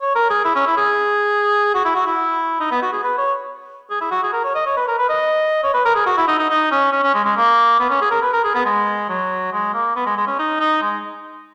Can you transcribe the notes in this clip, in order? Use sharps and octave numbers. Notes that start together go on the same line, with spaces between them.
C#5
A#4
G#4
E4
C#4
E4
G#4
F#4
E4
F#4
E4
D#4
B3
F#4
G#4
B4
C#5
G#4
E4
F#4
G#4
A#4
C#5
D#5
C#5
B4
A#4
B4
D#5
C#5
B4
A#4
G#4
F#4
E4
D#4
D#4
D#4
C#4
C#4
C#4
G#3
G#3
A#3
B3
C#4
G#4
A#4
B4
A#4
G#4
B3
G#3
F#3
G#3
A#3
B3
G#3
G#3
C#4
D#4
D#4
G#3